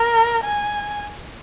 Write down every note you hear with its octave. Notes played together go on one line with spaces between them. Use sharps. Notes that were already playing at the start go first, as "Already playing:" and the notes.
Already playing: A#4
G#5